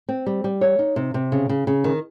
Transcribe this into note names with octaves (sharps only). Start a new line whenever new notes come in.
C4
G3
G3
C#5
D#4
C3
C3
C#3
C#3
C#3
D#3